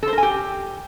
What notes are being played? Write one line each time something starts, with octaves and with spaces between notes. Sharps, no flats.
A4
C5
A#4
G#5
G4